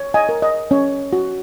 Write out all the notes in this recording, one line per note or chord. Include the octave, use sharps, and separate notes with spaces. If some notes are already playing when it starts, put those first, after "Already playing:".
Already playing: C#5
D#5 G#5
A#4
D#5
C#4 C#5
F#4